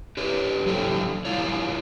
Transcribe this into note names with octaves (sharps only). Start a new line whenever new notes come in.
G4 B4 C#5
F#3 E4 G4 A4 C5
G3 E4 F4 C#5